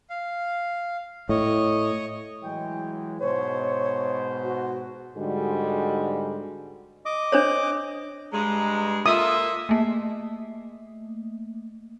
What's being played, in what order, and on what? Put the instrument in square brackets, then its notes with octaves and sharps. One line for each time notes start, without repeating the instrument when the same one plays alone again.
[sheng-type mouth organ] F5
[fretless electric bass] A2 [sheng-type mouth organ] C#5 D#5
[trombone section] E3 F#3 G#3 [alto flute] G5
[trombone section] G#2 B2 C5 [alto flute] C#5
[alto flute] F#4
[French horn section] G#2 D3 G3 G#3 F#4 G#4
[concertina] D#5 D6
[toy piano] D4 C5 C#5
[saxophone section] G2 G#3 [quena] A#5
[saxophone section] A#3 A4 E5 [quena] F4 [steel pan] D#6
[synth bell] A3 A#3